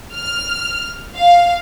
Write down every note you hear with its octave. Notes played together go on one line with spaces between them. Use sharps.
F6
F5